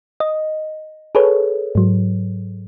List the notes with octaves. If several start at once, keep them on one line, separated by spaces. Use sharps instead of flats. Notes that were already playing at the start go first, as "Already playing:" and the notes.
D#5
G#4 A4 B4 C#5
G#2 F#3